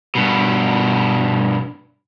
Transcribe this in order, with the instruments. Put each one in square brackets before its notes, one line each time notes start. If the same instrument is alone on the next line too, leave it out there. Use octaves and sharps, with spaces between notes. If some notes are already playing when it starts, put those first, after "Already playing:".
[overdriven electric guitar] G2 B2